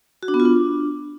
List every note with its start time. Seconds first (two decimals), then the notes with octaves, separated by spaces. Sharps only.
0.23 F#4
0.28 D4
0.34 B3
0.40 F4
0.45 D4